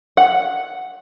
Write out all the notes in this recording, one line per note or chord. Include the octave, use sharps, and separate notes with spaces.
F#5